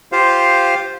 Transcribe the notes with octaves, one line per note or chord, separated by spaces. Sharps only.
F4 G4 C5 F5